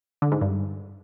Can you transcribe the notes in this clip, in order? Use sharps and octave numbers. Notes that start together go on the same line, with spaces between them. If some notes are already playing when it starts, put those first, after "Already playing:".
D3
G#2
G2